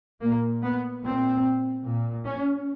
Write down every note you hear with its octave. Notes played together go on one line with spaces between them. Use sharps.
A#2 A#3
B3
A#2 C4
A#2
C#4